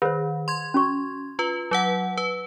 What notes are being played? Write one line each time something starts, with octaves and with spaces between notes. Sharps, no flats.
D#3 B4 C5
C6 G#6
C#4 F#4 C#6
F4 B4
F#3 B4 F#5
B4